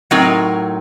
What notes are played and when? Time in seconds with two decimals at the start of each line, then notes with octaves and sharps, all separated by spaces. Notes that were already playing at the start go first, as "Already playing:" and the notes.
0.11 A2 F#3 C4 D#4 A#4